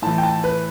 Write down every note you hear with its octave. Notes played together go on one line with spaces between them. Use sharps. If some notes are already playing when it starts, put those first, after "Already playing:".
A2 E3 A5
G5
A5
B4